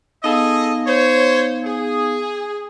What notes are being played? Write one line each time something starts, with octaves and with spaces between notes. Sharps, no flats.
B3 D#4 G#4 A4 D#5 F5
C5 C#5
G#4